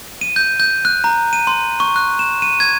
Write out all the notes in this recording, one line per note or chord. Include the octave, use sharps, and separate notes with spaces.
D#7
G6
G6
F#6
A#5
D#7
C6
C#6
F#6
E7
D#7
G#6